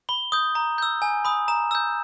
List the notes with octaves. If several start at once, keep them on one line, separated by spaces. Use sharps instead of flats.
B5 G7
D#6 G6
A#5
E6 G6
G#5
B5 D#6
A#5 E7
E6 G6